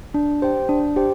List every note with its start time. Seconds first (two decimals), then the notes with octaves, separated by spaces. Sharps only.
0.14 D4
0.42 G4 C5 G5
0.69 D4
0.96 G4 C5 G5